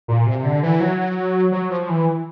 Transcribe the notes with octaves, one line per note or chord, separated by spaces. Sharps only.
A#2
C3
D3
E3
F#3
F#3
F3
E3